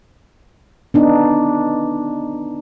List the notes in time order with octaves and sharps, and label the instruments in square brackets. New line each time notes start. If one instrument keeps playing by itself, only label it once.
[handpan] B3 D4 D#4